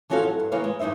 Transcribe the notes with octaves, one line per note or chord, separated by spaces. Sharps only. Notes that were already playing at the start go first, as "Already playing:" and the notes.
E3 F3 C#4 F#4 A4 F5
F#3
G2
C#3 E3 A#3 C#5 F5
G#3
E2 G2 D#4 C5 E5